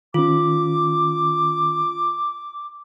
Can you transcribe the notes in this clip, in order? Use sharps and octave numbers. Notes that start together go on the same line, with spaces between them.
D#3 C#4 F4 D6